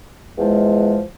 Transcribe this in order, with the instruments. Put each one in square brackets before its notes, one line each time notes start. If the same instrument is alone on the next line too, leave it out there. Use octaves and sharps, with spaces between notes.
[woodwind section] E2 F3 G#3